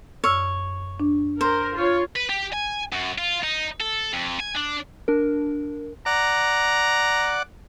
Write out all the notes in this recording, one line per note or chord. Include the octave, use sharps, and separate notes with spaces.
F#2 C#5 E6 F6
D4
A#4 C5
F4 C#5
B4
G4
G#5
F#2
F4
D#4
A4
F2
G#5
D4
D4 A#4
D5 F#5 A#5